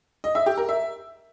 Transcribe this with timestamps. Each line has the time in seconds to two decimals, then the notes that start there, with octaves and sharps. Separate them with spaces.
0.24 D#5
0.35 E5
0.46 G4
0.57 A#4
0.69 E5